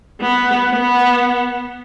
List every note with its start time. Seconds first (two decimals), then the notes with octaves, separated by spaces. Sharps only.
0.21 B3
0.70 B3